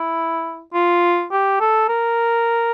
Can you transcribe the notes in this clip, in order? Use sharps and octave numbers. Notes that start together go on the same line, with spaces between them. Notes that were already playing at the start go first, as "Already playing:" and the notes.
Already playing: E4
F4
G4
A4
A#4